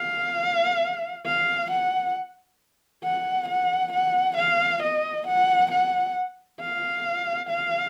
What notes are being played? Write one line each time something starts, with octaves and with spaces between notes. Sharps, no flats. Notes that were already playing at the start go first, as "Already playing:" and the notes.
Already playing: F5
F5
F#5
F#5
F#5
F#5
F5
D#5
F#5
F#5
F5
F5